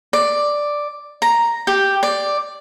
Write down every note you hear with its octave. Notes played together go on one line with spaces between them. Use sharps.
D5
A#5
G4
D5